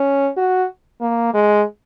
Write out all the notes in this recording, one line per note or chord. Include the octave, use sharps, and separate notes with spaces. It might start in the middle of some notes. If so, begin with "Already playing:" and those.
Already playing: C#4
F#4
A#3
G#3